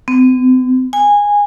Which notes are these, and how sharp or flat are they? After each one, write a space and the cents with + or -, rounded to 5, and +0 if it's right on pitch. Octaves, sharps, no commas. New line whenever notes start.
C4 -45
G#5 -15